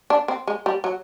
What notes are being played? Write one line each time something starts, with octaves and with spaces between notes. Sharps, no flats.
D4
C4
G#3
G3
F#3